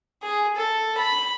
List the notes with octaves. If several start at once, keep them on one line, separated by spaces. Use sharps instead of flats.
G#4
A4
B5